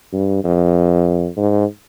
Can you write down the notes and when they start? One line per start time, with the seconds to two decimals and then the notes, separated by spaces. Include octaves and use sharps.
0.13 G2
0.44 F2
1.37 G#2